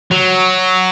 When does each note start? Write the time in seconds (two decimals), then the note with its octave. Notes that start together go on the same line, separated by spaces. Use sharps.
0.11 F#3